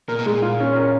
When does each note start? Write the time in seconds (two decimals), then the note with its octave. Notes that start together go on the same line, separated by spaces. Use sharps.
0.08 A#2 A#4
0.19 B2
0.26 A#2 G#3
0.42 F4
0.60 C#4
0.76 A#4